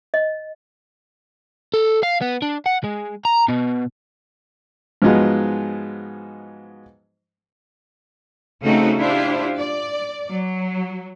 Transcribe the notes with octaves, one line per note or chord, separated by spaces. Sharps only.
D#5
A4
F5
B3
D4
F#5
G#3
A#5
B2
G#2 F3 F#3 G#3 B3 D#4
C#3 A3 C4 D#4 F#4 A4
D4 E4 F4 G4 C5
D5
F#3